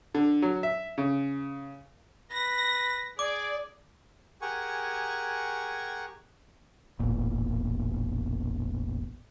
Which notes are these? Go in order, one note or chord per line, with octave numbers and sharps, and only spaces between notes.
D3
F#3
E5
C#3
B4 A#6
G#4 D5 D6
G4 G#4 A#4 F#5 G#5 C#6
E1 A1 A#2